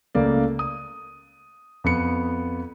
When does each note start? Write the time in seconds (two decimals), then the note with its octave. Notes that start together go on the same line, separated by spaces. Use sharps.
0.15 C#2 A3 A#3 D5
0.59 D#6
1.84 F2 B3 C#7